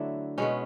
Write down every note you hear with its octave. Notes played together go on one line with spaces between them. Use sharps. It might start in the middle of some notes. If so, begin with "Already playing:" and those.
Already playing: D3 F#3 A3 E4
B2 G#3 B3 C#4